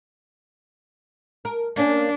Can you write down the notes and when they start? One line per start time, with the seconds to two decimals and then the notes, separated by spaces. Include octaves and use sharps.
1.45 A#4
1.76 A#3 C#4 D4